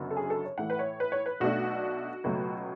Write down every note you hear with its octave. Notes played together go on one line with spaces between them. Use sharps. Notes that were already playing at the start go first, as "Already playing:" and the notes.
Already playing: F#1 F#2 D3 F#3 B3
A4
G#4
A4
C#5
A2 E3 A3 F#5
B4
C#5
B4
C#5
B4
B1 B2 A3 D4 F#4
C#2 B2 F#3 A3